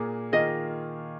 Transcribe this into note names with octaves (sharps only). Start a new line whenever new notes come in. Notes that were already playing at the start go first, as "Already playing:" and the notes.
Already playing: A#2 A#3 G#4
D#3 A#3 F4 G#4 D#5